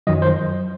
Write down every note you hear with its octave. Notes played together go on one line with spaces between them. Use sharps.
F#2 D#3 F#3 D#5
C5